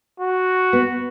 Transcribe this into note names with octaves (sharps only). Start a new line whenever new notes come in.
F#4
B3